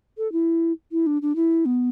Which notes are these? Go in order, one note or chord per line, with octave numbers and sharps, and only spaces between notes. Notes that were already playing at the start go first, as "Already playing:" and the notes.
A4
E4
E4
D4
D4
E4
B3